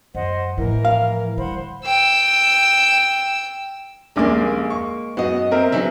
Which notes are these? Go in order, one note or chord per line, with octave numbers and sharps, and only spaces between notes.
F#2 C5 D#5 F#5
A2 E3 F3 A#4
F5
D3 G3 C5 F#5 B5
G5 E6
D#1 A#1 G#3 A#3 D6
C#6
F#2 B3 F#4 D#5
C4 A#4 E5
C#3 F#3 B3 D#4 E5